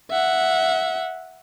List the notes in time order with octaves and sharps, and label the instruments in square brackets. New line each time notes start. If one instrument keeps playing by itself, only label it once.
[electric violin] E5 F#5